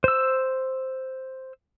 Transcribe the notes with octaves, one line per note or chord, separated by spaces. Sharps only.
C5 E6